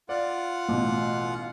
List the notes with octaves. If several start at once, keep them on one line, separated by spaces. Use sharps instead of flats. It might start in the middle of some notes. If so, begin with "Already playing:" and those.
F4 D5 F#5
A1 B2